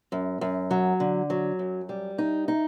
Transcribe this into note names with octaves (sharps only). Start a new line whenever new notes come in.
F#2
F#2
F#3
D3
F#3
F#2
G3
D#4
D#4